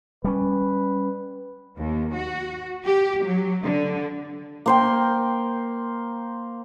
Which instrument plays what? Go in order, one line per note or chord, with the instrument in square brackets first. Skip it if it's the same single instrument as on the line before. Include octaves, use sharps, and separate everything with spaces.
[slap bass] G3 C#4 [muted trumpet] B4
[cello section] D#2
F#4
G4
F#3
D3
[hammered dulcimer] A#3 C5 G5